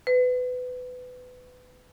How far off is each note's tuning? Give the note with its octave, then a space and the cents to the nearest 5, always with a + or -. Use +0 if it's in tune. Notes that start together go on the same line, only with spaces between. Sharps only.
B4 +20